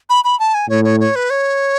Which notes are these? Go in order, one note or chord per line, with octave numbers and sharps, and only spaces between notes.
B5
B5
A5
G#5
A2 C#5
C#5
C#5
B4
C#5